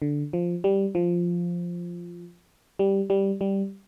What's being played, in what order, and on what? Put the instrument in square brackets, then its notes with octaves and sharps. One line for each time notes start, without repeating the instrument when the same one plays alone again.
[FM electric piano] D3
F3
G3
F3
G3
G3
G3